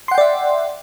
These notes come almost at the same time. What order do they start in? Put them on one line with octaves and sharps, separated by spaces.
C6 F#5 G5 D5 E5